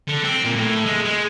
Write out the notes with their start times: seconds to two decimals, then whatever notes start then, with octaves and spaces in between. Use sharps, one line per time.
0.08 D3
0.24 C4
0.45 A#2
0.56 A2
0.86 G#3
1.06 G#3